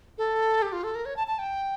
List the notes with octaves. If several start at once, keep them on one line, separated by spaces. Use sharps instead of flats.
A4
G4
F4
A4
A#4
C#5
A5
A5
G5